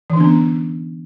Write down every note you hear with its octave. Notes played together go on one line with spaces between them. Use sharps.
D3 E3 B3 C#4 D4